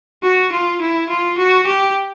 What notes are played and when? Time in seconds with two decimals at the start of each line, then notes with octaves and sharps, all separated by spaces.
0.23 F#4
0.52 F4
0.81 E4
1.09 F4
1.38 F#4
1.67 G4